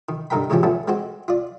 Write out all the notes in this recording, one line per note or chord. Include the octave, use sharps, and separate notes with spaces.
D#3
G2 D3 D#4 A#4 G5 B5
G#2 C#3 E3 F3 C#4 G4
F3 A3 B3 C#4
G#3 C4 F#4 C5
F4 D5